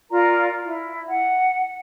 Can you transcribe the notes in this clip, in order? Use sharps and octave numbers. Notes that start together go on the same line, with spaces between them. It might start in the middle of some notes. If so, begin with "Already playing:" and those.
F4 A#4 D5 A#5
E4
F#5